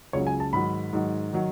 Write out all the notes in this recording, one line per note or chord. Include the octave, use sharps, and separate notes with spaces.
C#2 C#3 F#3 C#5
G#5
A5
G#2 D#3 F#3 B5
G#2 D#3 F#3
D#3 F#3